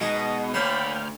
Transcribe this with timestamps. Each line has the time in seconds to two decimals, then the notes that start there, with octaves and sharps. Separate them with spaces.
0.01 B2 G#3 D#4 G#4 D#5
0.54 D2 D3 A#3 C#5 G5 B5 C6 F6